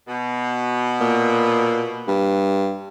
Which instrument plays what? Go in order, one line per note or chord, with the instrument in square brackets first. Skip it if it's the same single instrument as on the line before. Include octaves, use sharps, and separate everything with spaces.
[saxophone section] B2
[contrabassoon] A#2
G2